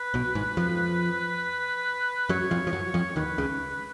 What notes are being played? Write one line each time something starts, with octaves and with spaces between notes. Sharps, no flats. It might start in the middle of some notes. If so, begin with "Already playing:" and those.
Already playing: B4
B1 B2
G#1 G#2
F2 F3
F#2 F#3 C#5
F2 F3
F3
F#2 F#3
F2 F3
D#2 D#3 B4
C#2 C#3